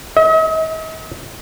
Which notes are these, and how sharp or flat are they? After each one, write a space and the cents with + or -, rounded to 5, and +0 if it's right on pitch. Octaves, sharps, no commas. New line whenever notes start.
D#5 +45